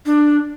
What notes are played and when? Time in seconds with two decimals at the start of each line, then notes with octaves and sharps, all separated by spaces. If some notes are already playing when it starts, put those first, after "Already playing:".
0.06 D4